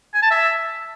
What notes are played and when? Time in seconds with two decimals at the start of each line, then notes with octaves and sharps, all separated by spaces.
0.14 G#5
0.22 A5
0.31 E5